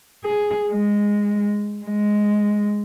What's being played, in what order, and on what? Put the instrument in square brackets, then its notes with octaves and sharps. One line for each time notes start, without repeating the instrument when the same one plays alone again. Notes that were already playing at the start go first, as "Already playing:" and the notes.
[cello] G#4
G#3
G#3